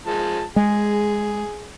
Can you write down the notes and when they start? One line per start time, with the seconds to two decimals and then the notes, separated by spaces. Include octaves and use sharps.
0.06 F3 G#3 A5
0.56 G#3 G#4